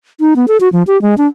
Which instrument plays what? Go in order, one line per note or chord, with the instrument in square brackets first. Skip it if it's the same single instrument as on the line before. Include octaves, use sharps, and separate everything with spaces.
[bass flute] D#4
B3
A4
F#4
F3
G4
G#3
D4